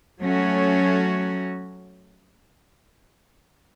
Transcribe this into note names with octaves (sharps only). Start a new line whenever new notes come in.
F#3 A3 C#4 F#4